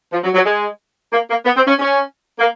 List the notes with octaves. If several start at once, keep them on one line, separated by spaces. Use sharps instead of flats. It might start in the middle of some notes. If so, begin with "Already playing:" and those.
F3
F#3
F#3
G#3
A#3
A#3
B3
C4
C#4
C#4
A#3